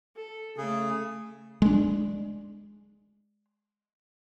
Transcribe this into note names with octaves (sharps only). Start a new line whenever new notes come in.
A4
C#3 A3 G#4
G#3 D4